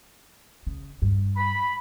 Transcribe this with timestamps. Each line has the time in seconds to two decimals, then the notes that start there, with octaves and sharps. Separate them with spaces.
0.67 C#3
1.02 G2
1.37 B5